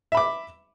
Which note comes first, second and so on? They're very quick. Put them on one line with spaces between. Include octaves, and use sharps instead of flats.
E5 B5 D6